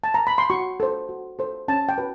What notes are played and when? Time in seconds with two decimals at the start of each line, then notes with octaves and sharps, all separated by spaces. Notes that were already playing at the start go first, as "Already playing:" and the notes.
0.04 A5
0.14 A#5
0.27 B5
0.38 C6
0.50 F#4 C#6
0.80 A4 C5
1.09 F#4
1.39 A4 C5
1.68 C#4 A5
1.89 G5
1.98 F#4 B4